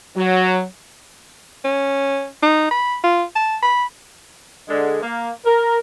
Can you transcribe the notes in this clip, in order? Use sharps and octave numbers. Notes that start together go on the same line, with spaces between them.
F#3
C#4
D#4
B5
F4
A5
B5
D3 G#3
A#3
A#4